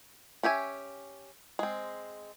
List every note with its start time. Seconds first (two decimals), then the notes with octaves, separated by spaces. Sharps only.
0.43 C#4 G4 E5 G#5
1.59 G#3 C4